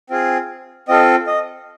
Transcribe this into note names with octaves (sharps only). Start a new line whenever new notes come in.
C4 F4 G#4
C4 F4 A4 D#5
D#5